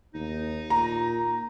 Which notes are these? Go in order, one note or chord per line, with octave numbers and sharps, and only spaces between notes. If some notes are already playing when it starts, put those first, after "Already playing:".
D#2 D#4
A#2 A#5